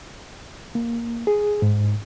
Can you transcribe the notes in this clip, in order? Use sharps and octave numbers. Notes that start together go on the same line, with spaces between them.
A#3
G#4
G#2